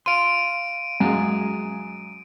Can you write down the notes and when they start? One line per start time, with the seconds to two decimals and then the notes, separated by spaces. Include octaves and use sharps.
0.06 F5 C6 D7 D#7
1.00 F#2 G#3 F5 G#5 A#5